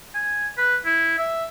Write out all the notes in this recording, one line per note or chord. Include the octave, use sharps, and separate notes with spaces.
G#5
B4
E4
E5